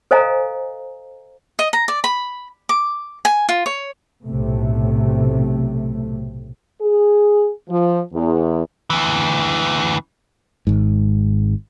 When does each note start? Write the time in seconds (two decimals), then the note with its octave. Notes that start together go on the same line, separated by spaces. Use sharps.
0.11 A4 C5 D#5 F5 G#5 A#5
1.59 D#5
1.73 A#5
1.88 D5
2.04 B5
2.69 D6
3.25 G#5
3.49 F4
3.66 C#5
4.27 B1 A2 C3 A3
6.81 G#4
7.69 F3
8.13 E2
8.90 D2 E3
10.67 G#1 G#2